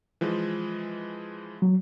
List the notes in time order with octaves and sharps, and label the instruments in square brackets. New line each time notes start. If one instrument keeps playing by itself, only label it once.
[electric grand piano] E3 F3 G#3
[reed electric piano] F#3